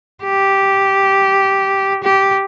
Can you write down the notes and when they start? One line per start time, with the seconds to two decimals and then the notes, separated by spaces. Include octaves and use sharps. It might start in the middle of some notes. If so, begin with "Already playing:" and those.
0.24 G4
2.03 G4